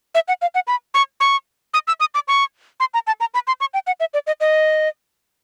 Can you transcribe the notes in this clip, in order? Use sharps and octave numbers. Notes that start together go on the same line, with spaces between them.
E5
F#5
F5
F#5
B5
C#6
C#6
D#6
E6
D#6
D6
C#6
C6
A#5
A5
A#5
B5
C6
C#6
G5
F#5
E5
D5
D#5
D#5